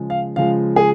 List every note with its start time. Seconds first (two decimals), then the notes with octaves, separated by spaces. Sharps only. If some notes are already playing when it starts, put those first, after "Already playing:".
Already playing: C#3 F3 G#3
0.10 F5
0.36 C#3 F3 G#3 F5
0.76 G#4